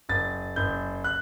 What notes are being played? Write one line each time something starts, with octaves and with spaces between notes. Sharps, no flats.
F#1 A6
F#1 G6
F#6